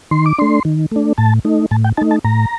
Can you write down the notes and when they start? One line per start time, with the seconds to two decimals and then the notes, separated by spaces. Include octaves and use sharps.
0.11 D#3 C6
0.26 D6
0.38 A3 D4 C6
0.65 D#3
0.91 A3 D4
1.18 A2 A5
1.45 A3 D#4
1.71 A2 A5
1.84 G5
1.97 A3 D#4 A5
2.11 A5
2.24 A2 A#5